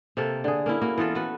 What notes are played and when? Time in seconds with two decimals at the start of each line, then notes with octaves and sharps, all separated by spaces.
0.17 C3 A#3 A4
0.44 D3 G#4
0.66 A#3 C#4 E4
0.81 A#3 F#4
0.98 E3 B3 F4 A4
1.15 F#4 B4